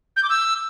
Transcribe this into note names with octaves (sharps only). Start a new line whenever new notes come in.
G6
D6
E6